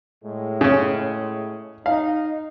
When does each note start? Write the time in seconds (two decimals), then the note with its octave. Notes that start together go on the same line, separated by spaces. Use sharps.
0.23 A2 G#3
0.61 C#3 C#4
1.86 D#4 F5